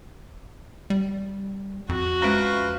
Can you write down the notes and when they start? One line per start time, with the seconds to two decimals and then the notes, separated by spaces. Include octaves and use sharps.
0.90 G3
1.89 F2 F#4
2.22 F3 G#3 C#4 B4